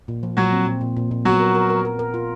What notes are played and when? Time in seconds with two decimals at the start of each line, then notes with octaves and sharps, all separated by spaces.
0.08 A#2
0.23 F3
0.37 A#2 F#3 F#4
0.52 C4
0.67 A#2
0.81 A#2
0.97 A#2
1.11 A#2
1.25 F#3 B3 F#4
1.40 A#4
1.55 A#4
1.70 A#4
1.85 A#4
1.99 A#4
2.14 F4